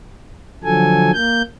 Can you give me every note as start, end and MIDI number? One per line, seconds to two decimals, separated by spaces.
0.63 1.11 50
0.63 1.11 53
0.63 1.11 54
0.63 1.11 69
0.63 1.11 80
1.14 1.42 58
1.14 1.42 91